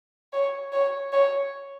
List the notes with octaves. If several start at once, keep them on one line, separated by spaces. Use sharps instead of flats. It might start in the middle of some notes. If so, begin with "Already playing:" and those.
C#5
C#5
C#5